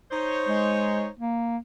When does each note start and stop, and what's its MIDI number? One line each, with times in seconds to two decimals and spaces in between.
0.11 1.09 63
0.11 1.09 72
0.11 1.09 73
0.48 1.08 56
1.20 1.57 58